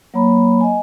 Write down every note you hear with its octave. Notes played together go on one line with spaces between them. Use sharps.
F#3 A#3 C#5 A#5 B5
D#5 G#5